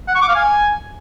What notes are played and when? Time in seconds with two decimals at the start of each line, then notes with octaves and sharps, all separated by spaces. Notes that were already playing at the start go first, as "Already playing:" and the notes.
0.08 F#5
0.15 C#6
0.22 D6
0.28 F5
0.35 G#5